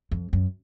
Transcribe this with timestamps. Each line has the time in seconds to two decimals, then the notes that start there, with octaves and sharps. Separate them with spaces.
0.11 F2
0.33 F#2